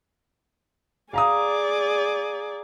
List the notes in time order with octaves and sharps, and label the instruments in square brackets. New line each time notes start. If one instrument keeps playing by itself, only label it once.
[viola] G#4 D5 [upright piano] F5 A#5 D#6